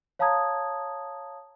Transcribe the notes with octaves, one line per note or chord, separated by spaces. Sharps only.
C#5 F5 A5 A#5 D#6 G#6